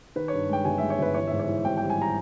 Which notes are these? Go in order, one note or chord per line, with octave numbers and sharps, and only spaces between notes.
D#3 B4
G2 C#5
G#3 G5
G1 G#5
G#3 E5
C#5
G1 B4
E3 C#5
G#2 E5
C#5
E3
G#1 G5
G3 G5
G#5
G3 A#5